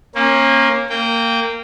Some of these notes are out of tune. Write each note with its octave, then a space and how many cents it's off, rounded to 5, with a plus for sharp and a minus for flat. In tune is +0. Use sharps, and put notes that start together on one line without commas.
A#3 +0 C#4 -35
A#3 -20 G5 +0